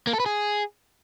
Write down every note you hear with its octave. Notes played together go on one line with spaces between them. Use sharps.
A#3
A4
B4
G#4